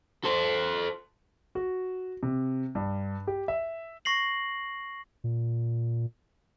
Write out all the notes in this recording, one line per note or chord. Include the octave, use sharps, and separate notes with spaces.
A4 C5
F#4
C3
G2
G4
E5
C#6 A#6 C7 F#7
A#2